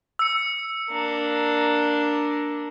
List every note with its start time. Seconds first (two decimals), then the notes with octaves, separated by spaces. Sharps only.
0.19 E6 C#7
0.91 A#3 D4